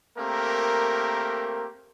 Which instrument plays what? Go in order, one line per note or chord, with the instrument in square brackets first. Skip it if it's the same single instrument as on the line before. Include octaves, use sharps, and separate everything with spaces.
[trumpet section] A3 A#3 C4 G4 A#4